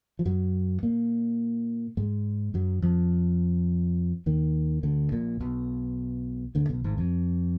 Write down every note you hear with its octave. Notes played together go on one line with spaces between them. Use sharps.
F3
F#2 F#3
A#2 A#3
G#2 G#3
F#2 F#3
F2 F3
D#2 D#3
D2 D3
A#1 A#2
B1 B2
D2 D3
B1 B2
G#1 G#2
F2